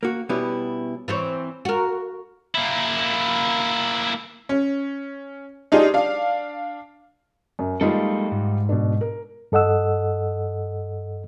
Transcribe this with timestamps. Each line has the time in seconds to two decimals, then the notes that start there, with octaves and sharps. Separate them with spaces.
0.03 A#3 F#4
0.29 B2 G3 B3 C#4 E4
1.08 E3 C4 C#5
1.65 F#4 A#4
2.55 A#3 E4
4.49 C#4
5.72 D4 D#4 F4 G4 G#4
5.94 D4 F5
7.59 F#2
7.81 G3 G#3 A#3 D#4 F4 A4
8.32 G#2
8.69 B2 D4
9.01 A#4
9.52 G2 A4 D#5 F#5 E6